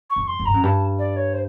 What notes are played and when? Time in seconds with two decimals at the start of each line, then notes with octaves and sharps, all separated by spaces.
0.10 C#6
0.16 F2
0.28 C6
0.39 F#2
0.45 G2 A#5
0.54 F#2
0.63 G2 A5
0.99 D5
1.16 C#5
1.33 C5